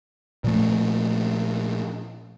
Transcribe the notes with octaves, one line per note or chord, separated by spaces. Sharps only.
A#2 F3 A3